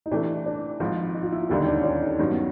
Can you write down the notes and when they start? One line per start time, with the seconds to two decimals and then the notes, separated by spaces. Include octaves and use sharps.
0.06 D#4
0.11 C3 E3 A3 D4
0.46 D4
0.80 G#1 G#2 F3 D#4
1.14 D#4
1.23 F4
1.32 E4
1.42 F4
1.49 E1 D#2 D3 G3 E4
1.58 D#4
1.67 D4
1.76 C#4
1.84 D4
2.02 D#4
2.19 G2 D#3 F#3 C#4
2.31 B3